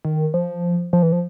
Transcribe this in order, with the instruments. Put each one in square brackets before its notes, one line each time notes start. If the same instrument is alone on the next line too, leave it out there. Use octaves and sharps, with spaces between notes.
[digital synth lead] D#3
F3
F3
E3
F3